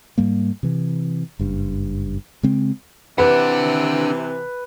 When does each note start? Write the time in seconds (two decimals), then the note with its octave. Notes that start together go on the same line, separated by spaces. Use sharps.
0.18 G#2 G3 A#3
0.63 C3 E3
1.39 F#1 G2
2.43 C#3 G#3 C4
3.18 C3 E3 D4 B4 F#5